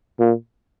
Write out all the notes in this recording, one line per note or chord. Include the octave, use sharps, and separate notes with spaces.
A#2